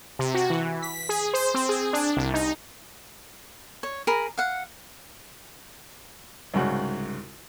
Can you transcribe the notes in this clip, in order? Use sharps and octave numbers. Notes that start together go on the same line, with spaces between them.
C3
F#4
E3
B6
G#4
C5
C4
G#4
D4
C2
D#4
C#5
G#4 A#4 A#5 B5
F5 F#5
C2 G#2 C#3 F#4 F#6